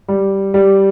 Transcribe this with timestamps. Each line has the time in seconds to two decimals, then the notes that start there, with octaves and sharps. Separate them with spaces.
0.08 G3
0.54 G3